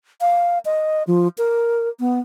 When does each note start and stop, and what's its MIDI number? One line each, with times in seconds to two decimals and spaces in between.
0.21 0.58 77
0.65 1.03 75
1.07 1.28 53
1.38 1.88 70
2.00 2.19 59